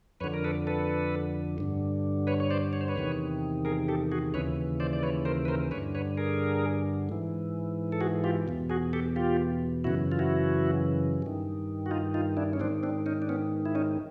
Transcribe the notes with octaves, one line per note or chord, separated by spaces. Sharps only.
F2 D3 B4 C#5
A#4
A4 B4
A4 B4
G2 D3
B4 C#5
C#5
C5 D5
C#5
C5
B4 C#5
E2 C3 D#3
G#4 A#4
G4 A4
F#4 G#4
D#2 C#3 E3 B4 C#5
C5 D5
D5
B4 C#5
A#4 C5
B4
A#4 C5
G2 D3 B4 C#5
B4 C#5
G#4 A#4
G#2 E3
A4
F#4 G#4
F4 G4
E2 B2
F#4 G#4
G4 A4
F4 G4
F#2 C#3 E3 E4 F#4
F4
E4 F#4
G2 D#3
F#4
D#4 F4
D#4 F4
D4 E4
C#4
G#2 D#3 C4 D4
C4 D4
C#4 D#4
D4
B3 C#4
E4
C#4 D#4